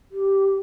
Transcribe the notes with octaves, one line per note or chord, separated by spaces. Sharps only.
G4